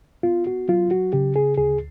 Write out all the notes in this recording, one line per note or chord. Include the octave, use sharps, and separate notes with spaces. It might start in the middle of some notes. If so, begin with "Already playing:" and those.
B3 F4
F#4
F#3 F4
F#4
C#3 G4
G#4
D2 G#4